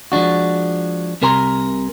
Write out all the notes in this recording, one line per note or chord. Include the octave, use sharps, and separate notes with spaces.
F3 G#3 D4 F#4
C2 C3 A#4 G#5 A#5 C6